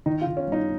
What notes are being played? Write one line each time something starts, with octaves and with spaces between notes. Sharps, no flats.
D#3 D#4
F4
D#3
C#4
G2 D#4